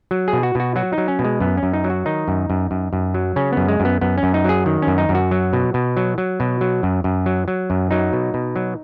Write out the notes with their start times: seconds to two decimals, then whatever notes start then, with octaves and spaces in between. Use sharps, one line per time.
0.11 F#3
0.28 G#4
0.33 B2
0.43 F#4
0.55 B2 F#4
0.76 F#3 F#4
0.93 D#4
0.98 F#3
1.08 C#4
1.19 B2
1.25 G#3
1.40 F#2 B3
1.57 C#4
1.63 F#2
1.74 D#4
1.84 F#3
1.90 F#4
2.06 D#3 D#4
2.28 F#2
2.50 F#2
2.71 F#2
2.93 F#2
3.14 F#3
3.36 C#3 C#4
3.53 F#2 B3
3.68 G#3
3.80 F#2
3.85 B3
4.01 F#2 B3
4.18 C#4
4.23 F#2
4.34 D#4
4.44 F#3 G#4
4.66 D#3
4.82 F#2 C#4
4.98 D#4
5.09 F#2
5.15 F#4
5.31 F#3
5.53 B2
5.74 B2
5.97 F#3
6.18 F#3
6.40 B2
6.61 F#3
6.83 F#2
7.04 F#2
7.26 F#3
7.48 F#3
7.70 F#2
7.91 F#3 D#4
8.13 B2
8.34 B2
8.56 F#3